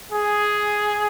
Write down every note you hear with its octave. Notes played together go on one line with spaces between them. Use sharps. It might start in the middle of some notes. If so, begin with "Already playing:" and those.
G#4